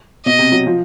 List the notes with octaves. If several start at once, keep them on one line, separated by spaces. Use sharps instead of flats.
B2 D#5
C3
F#3
F3